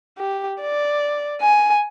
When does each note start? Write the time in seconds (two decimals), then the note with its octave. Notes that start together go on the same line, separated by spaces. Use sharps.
0.18 G4
0.61 D5
1.41 G#5